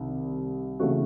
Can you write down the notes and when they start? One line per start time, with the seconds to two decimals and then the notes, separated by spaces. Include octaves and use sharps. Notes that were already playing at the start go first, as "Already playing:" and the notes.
Already playing: C2 C3 D#3 G3
0.80 C#3 E3 A3 C#4 F#4